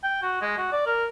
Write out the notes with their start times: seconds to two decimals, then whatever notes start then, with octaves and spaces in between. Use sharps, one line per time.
0.03 G5
0.22 F#4
0.41 G#3
0.58 F#4
0.72 D5
0.86 A#4